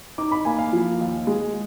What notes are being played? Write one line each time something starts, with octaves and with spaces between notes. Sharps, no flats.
D#4 D6
B5
A#3 G#5
F5
F3
D#2
G#3